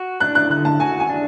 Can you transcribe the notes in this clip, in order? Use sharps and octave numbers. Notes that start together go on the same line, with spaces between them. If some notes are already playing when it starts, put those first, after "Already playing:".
Already playing: F#4
D4 F#6
F#6
D3 F#6
A5
F#4 G#5
G#5
D4